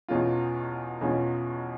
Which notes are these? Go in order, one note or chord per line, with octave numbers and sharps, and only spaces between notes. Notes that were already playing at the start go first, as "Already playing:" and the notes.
E2 B2 G#3 C#4 F4
E2 B2 G#3 C#4 F4